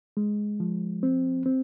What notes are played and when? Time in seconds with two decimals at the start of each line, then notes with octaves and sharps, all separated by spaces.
0.17 G#3
0.60 F3
1.03 C4
1.46 C4